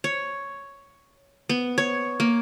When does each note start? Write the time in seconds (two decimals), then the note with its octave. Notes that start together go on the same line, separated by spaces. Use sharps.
0.04 C#5
1.49 B3
1.78 C#5
2.20 A#3